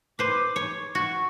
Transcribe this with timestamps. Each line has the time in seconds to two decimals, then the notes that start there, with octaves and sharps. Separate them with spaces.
0.19 B4 C5 D6
0.56 C#5
0.95 F#4 C#6